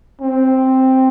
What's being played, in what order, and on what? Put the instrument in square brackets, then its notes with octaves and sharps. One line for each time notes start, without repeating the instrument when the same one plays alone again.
[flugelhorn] C4